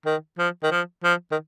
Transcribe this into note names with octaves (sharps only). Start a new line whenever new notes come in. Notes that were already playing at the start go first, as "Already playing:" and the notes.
D#3
F3
D#3
F3
F3
D#3